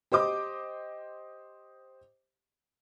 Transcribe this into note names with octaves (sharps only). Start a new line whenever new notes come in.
G4 C5 D#5 D6